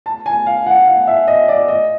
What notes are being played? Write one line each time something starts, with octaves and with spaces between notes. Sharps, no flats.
A5
G#5
F5
F#5
F5
E5
D#5
D5
D#5